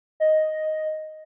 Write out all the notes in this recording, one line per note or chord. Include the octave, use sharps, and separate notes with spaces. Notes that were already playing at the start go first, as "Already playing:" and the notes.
D#5